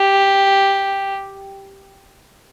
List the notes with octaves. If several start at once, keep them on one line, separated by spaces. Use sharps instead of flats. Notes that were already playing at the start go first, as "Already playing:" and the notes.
Already playing: G4